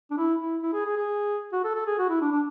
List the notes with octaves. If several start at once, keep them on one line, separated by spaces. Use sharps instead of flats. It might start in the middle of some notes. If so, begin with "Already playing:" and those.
D4
E4
E4
E4
G#4
G#4
G#4
F#4
A4
A4
G#4
F#4
E4
D4
D4